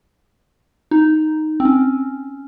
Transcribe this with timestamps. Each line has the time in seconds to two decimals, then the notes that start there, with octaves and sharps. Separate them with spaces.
0.91 D#4
1.60 C4
1.65 C#4